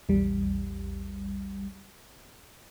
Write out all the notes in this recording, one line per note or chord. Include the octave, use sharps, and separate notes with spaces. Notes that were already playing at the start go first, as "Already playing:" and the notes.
A#1 E2 G3